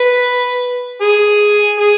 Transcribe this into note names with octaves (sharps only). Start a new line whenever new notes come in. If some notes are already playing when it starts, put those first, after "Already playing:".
Already playing: B4
G#4
G#4